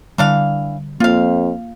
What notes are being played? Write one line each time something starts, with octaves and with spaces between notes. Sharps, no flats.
D3 E3 G3 D4 F5
F2 A#3 F4 F5